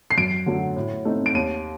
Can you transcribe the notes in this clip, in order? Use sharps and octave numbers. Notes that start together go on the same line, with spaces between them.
C7
F#2 D7
D3 F#3 A3
A2
A3 C4 D#4
D7
D#2 D#7